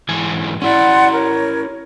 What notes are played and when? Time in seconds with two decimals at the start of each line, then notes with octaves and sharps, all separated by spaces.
0.09 G#2 E3 G#5
0.62 C#4 E4 D5 F#5 C6
1.13 A#4 C#5